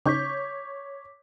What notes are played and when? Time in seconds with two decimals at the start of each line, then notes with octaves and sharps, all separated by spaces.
0.06 C#3 C#4 D#4 C#5 C#6 D6 G6 B6